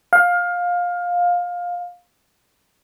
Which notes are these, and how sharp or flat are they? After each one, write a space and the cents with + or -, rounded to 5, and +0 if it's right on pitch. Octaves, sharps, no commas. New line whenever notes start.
F5 +20